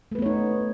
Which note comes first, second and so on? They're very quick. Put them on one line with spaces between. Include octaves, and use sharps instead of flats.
A3 B4 B3 C#5 D#4